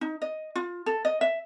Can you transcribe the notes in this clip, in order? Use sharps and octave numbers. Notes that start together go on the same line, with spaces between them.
D#4
D#5
F4
A4
D#5
E5